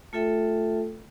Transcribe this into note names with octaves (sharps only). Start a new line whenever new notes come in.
A3 F4 A4 E5 G5